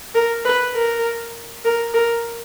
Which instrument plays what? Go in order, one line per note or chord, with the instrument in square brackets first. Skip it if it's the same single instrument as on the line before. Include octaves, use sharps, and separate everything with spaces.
[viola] A#4
B4
A#4
A#4
A#4